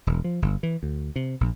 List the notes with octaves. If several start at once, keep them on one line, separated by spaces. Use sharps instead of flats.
E1
F3
G1
E3
D2
C3
A#1